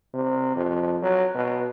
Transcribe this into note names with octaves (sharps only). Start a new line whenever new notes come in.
C3
F2
F#3
B2